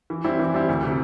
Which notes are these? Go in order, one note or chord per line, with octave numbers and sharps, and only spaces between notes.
E3
G3 C4 E4 G4
E3
G3 C4 E4 G4
D2
C3 E3